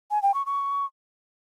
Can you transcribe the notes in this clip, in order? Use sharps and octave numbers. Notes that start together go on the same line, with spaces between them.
G#5
G5
C#6
C#6